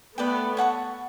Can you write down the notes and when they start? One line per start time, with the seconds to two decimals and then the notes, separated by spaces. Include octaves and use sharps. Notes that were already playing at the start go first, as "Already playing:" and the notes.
0.17 A3 B3 B4 D5 G5
0.57 C#5 F#5 A5 C#6